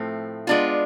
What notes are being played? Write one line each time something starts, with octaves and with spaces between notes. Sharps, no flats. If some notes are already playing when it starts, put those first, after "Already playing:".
Already playing: A2 F3 A3 C4
G#3 B3 D4 F4